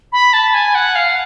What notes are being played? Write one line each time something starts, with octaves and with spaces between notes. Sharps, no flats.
B5
A5
G#5
F#5
F5